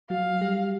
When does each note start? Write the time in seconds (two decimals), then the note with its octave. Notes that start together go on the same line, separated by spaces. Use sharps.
0.10 F#3 F#4 F5
0.41 G3 G4